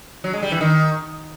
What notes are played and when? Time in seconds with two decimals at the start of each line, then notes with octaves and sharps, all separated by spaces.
0.24 F#3
0.33 G#3
0.42 G3
0.52 E3
0.61 D#3